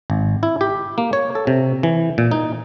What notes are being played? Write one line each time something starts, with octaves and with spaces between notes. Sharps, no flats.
G#1
E4
G4
A#3
C#5
A4
C3
E3
A#2
D#4